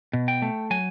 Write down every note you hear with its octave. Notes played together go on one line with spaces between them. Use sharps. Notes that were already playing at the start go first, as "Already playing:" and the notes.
B2
G5
A3
F#3 G#5